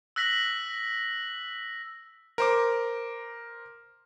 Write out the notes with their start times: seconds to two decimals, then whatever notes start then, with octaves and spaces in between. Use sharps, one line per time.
0.16 E6 F#6 A#6 B6 F#7
2.38 A#4 C5 D6